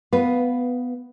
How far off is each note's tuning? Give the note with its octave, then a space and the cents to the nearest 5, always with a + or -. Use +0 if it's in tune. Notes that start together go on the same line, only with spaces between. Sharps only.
B3 +10 B4 +0 F5 +10